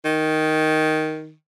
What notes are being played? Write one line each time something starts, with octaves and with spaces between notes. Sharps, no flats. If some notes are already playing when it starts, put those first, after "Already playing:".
D#3